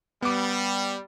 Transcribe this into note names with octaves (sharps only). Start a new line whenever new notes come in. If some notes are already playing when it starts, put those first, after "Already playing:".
G3 B3 D6